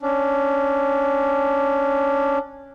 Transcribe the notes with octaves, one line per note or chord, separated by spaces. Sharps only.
C#4 D4